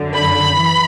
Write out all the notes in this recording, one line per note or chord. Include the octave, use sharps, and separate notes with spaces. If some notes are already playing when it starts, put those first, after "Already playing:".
Already playing: F#2 D3
B5
E3